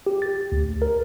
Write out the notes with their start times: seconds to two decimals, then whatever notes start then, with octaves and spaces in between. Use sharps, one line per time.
0.07 G4
0.22 A6
0.52 D2
0.82 A#4